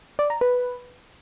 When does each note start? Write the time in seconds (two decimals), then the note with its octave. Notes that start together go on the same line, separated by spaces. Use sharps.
0.19 D5
0.30 A#5
0.41 B4